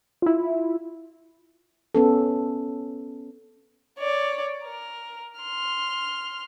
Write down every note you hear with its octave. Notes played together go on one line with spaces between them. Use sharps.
E4 F4
B3 C#4 A4
C#5 D5
A#4
C6 F6